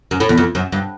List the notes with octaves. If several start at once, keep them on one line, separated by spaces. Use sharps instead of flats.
F#2
A2
E2
F2
F#2
G2